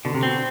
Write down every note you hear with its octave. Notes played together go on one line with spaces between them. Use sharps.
B2 D3
C3
B2 C4